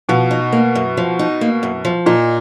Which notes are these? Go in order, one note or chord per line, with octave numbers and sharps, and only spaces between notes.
B2 F3
D#4
A#3
F#2
F3
D#4
A#3
F#2
F3
A#2 D#4